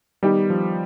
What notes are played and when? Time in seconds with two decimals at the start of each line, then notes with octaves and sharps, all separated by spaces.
0.23 D#3 G3 B3 D#4 G4
0.50 F3